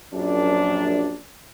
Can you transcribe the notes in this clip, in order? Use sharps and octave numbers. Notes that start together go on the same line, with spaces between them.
A#1 F#2 D4